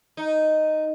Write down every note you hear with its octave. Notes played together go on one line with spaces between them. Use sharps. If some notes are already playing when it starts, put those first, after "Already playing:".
D#4